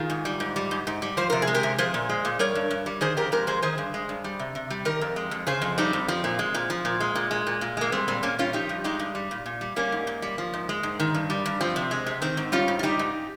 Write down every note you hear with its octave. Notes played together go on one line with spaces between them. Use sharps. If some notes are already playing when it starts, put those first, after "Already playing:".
Already playing: D#3 F4 G#4
G#2
G3
G#2
G3
G#2
G#2
G3
F3 C5
C3 A#4
G#4
G#3
G4 A#4
C3
F3 G#4 C5
A#2
G#3
A#2
G3 A#4 C#5
G2
G2
G3
D#3 G#4 C5
F2 G4 A#4
G#3 G4 A#4
F2 G#4 C5
D#3 G#4 C5
G2
G#3
G2
G3
C3
C3
G3
D#3 G4 A#4
F2
G#3
F2
C#3 G#4 C5
F2
G3 C4 D#4
F2
F3 C4
A#2
G#3
A#2
F3
A#2
G#3
A#2
G#3
A#2
A#2
G#3 A#3
G3 C4
A#2 C4
A#2 A#3 C#4
G3 C#4 F4
F3 D#4 G4
G2
G#3 D#4 G4
G2
G3
A#2
A#2
G3
G3 A#3 C#4
G#2
G#2
G3
F3
G#2
G#3
G#2
D#3
G2
G3
G2
F3 C4
C3
G#3
C3
D#3 C4
G#2
G3 C#4 F4
G#2
F4
G3 D#4 G4
G#2